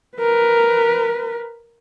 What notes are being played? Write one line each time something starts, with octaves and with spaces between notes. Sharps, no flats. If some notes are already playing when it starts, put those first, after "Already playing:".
A#4 B4